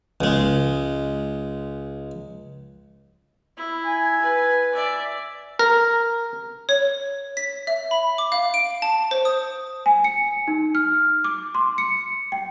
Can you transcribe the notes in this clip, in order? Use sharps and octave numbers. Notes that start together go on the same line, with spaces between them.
C#2 G#3
E4
G#5
B4
D5 E5
A#4
C#5
B6
E5
B5
D6
F5
D7
A5
C5
D#6
G#5
C#7
D#4
F6
D6
C6
C#7
G5